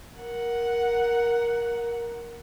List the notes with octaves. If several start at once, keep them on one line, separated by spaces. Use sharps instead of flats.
A#4 F#5